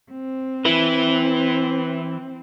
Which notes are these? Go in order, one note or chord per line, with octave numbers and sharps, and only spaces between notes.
C4
E3 E4 B4